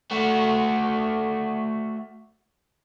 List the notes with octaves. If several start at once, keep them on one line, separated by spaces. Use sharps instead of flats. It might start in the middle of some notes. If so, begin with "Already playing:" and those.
A3 F#4